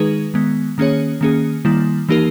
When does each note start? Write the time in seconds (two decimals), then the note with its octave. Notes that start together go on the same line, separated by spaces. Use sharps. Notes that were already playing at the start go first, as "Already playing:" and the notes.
Already playing: D#3 G#3 D#4 G#4 B4
0.34 D#3 G#3 B3
0.78 D#3 A#3 C#4 G#4 C#5
1.21 D#3 A#3 C#4 G#4
1.65 D#3 G3 A#3 E4
2.09 E3 A#3 D#4 G4 A#4